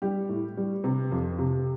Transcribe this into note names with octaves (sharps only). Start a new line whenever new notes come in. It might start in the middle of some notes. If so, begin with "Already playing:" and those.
G3 G4
A2
G3
C3
F2
C3